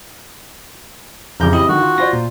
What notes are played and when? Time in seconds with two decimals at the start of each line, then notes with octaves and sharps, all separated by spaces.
1.40 A1 F2 C#3 A#5 D6 G6
1.53 C4 E4 G4 D#5
1.69 D3 D#3 F#4
1.81 F4
1.98 F4 C5 D5 A#6
2.13 A#2